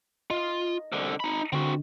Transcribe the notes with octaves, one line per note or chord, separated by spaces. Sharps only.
F4 D#5
C2 D3
D#4 B5
D3 C4 F#4